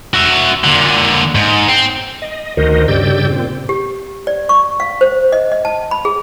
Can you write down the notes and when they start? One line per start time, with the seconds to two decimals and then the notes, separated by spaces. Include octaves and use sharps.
0.14 F#4 E5
0.64 A#2 D3
1.35 G#2
1.68 C4
2.22 D#5
2.57 D2 D#3 F#4 A#4 C5 D#5
2.88 G2 C#3 G4 D5 E6 G6
3.30 A#2 C4
3.69 G4
4.27 D5
4.49 C#6
4.80 F5
5.01 C5
5.32 D#5
5.52 D#5
5.65 A5
5.91 B5
6.05 G#4